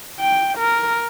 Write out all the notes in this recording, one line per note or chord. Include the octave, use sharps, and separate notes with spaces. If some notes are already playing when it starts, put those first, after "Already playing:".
G5
A#4